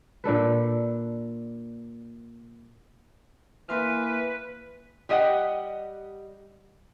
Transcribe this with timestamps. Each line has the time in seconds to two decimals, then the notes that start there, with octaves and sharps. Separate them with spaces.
0.24 A#2 D4 A4 B4
3.69 E3 A#3 B4 C6 F6
5.09 G3 G4 D#5 F5 F#5